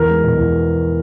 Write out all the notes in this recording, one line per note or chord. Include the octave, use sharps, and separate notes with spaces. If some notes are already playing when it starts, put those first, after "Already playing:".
Already playing: E2 A#4
G#3
B2
E2